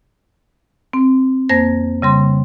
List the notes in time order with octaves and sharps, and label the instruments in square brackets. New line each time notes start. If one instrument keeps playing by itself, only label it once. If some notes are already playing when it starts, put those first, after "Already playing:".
[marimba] C4
F2 A#3 C5 A#6
C#3 G3 C6